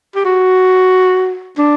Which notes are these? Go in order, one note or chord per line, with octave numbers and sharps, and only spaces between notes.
G4
F#4
D4